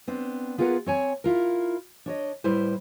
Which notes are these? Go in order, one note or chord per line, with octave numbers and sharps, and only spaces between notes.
B3 C4 D4
B3 F4 G#4 A#4 B4 F#5
C4 C#5 G#5
E4 F4 A#4
D4 C#5 D#5
A2 G3 E4 B4 C5